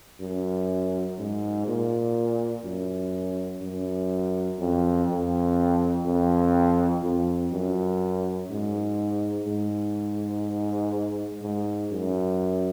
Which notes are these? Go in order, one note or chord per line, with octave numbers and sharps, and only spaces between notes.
F#2
G#2
A#2
F#2
F#2
F2
F2
F2
F2
F#2
G#2
G#2
G#2
F#2